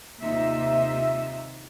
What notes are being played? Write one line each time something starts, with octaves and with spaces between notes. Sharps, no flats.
D#2 C3 A#3 D#4 F4 E5